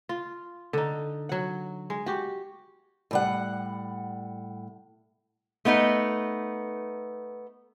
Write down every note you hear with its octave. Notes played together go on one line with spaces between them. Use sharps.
F4
D3 D#4
F#3 F#5
G#3
F#4 G4
A2 G3 F#5
A3 B3 D#4 B4